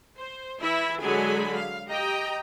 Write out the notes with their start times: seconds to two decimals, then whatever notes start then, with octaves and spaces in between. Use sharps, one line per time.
0.19 C5
0.61 E3 E4 E5
1.01 D3 F#3 G#3 G#4 G#5 B5
1.54 F5
1.88 G4 D#5 G5 A#5